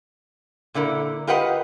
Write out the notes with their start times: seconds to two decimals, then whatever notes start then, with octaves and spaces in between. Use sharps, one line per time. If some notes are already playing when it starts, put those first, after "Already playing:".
0.74 A#2 D3 E4 A#4
1.27 F4 G4 A#4 B4 D#5 F#5